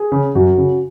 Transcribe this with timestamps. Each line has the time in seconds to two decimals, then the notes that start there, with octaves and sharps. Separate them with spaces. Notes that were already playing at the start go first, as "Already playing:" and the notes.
Already playing: G#4
0.12 C#3
0.35 F#2 F#4
0.58 C#3